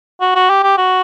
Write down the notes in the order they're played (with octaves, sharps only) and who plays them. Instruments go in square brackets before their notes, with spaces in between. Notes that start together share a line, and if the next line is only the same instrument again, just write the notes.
[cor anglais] F#4
F#4
G4
G4
F#4